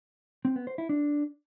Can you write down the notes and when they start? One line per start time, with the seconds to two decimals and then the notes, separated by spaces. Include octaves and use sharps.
0.45 C4
0.56 B3
0.67 C5
0.78 E4
0.89 D4